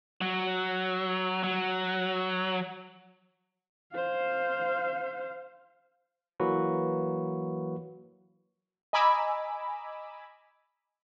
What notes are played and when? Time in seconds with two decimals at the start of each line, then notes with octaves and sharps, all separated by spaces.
0.21 F#3
1.44 F#3
3.93 C5 F5
6.40 E3 F#3 A#3 F#4 B4
8.93 D#5 G#5 A#5 B5 D6 E6